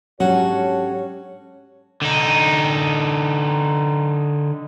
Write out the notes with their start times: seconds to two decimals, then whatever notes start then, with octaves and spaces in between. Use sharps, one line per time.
0.20 G#2 F#3 C#4 D4 F#4 G4 A4 C#5
2.02 D3 D#4